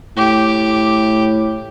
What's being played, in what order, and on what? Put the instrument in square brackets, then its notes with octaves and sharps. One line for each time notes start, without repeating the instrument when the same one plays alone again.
[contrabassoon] A2 [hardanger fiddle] G4